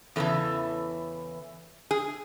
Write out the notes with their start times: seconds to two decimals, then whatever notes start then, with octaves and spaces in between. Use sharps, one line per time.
0.16 E2 C#3 E3 A4
1.91 G#4